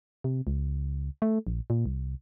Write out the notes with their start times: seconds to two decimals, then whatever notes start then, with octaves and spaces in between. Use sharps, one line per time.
0.24 C3
0.47 C#2
1.22 A3
1.47 A#1
1.70 A#2
1.86 C2